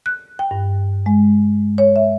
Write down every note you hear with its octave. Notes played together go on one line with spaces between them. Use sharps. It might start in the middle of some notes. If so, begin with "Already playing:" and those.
F#6
G5
G2
G#3
C#5
E5